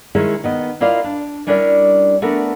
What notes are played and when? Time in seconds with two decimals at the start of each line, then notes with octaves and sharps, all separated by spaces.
0.15 D#3 G#3 C#4 E4 G#4
0.44 D#3 B3 D#5
0.80 E4 F4 A#4 D5 D#5 F5
1.04 D4
1.47 G3 C#4 D4 E4 A#4 D5
2.22 A3 B3 D4 F#4 A#4